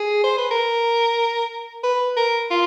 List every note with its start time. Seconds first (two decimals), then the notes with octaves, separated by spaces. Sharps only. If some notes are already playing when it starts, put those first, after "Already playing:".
Already playing: G#4
0.24 C5
0.38 B4
0.51 A#4
1.84 B4
2.17 A#4
2.51 F4